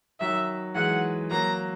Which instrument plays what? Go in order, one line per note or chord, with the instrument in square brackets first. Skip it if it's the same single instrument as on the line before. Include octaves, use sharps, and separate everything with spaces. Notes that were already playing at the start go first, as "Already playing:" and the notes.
[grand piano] D#3 F#3 [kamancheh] E5
[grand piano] E3 G#3 [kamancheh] F#5
[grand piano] F#3 A#3 [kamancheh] A#5